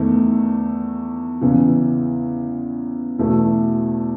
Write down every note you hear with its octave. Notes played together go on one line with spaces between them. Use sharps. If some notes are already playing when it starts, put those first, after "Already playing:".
Already playing: E2 D#3 A3
E2 C#3 E3
E2 B2 A3 E4